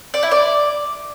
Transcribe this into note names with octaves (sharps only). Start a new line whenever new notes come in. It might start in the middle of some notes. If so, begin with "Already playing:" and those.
D5
E4
D5